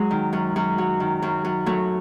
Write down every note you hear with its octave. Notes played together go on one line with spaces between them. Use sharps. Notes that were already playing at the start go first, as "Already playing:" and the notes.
Already playing: F#3 G#3
D#3
F#2
F#2
F#3
D#3
F#2
F#2
F#3 A3